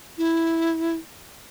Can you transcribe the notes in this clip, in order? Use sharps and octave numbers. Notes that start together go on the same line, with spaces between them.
E4